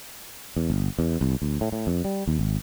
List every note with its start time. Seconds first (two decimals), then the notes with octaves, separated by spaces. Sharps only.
0.56 E2
0.70 G1
0.99 E2
1.21 C2
1.42 D2
1.61 A2
1.72 A2
1.87 F2
2.05 G3
2.27 D#2
2.39 G#1